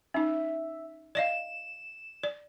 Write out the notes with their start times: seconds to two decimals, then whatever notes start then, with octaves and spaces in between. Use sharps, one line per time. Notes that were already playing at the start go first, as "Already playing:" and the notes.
0.14 C#4 D#4 E5
1.15 D5 D#5 F5 E7
2.23 D5